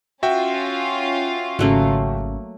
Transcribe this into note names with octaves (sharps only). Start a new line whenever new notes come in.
C#4 F4 F#4 E5 G5
G#1 C#3 F#3 A3 A#3